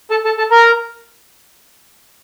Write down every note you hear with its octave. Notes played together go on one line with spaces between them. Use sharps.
A4 A5
A4 A5
A4 A5
A#4 A#5